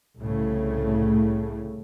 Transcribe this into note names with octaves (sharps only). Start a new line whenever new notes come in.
C2 A2 C#3 A3